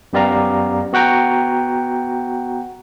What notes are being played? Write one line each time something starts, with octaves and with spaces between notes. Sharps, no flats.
F#2 B3 G4 D5 F5 A#5
B3 F#4 F#5 G5 A#5